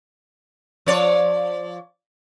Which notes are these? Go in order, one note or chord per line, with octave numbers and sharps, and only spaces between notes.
F3 C#5 D5